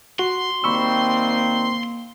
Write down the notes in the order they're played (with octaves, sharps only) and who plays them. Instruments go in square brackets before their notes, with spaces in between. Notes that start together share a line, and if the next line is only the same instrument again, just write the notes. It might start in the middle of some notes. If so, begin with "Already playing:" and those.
[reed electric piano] F#4 [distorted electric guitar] C6
[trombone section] D#3 G3 C4 [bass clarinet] A#3 [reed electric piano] B5 C#6 E6